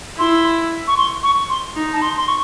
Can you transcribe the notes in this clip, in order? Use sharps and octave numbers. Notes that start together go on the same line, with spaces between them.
E4 C6
C#6
C6
C#6
C6
D#4
A5
C6
C6
C#6